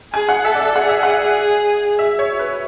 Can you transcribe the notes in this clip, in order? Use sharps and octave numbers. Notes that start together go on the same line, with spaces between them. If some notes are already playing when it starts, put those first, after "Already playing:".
G#4 G#5
F#5
A4 E5
D5
E5
G#4 F#5
E5
F#5
E5
C#5
B4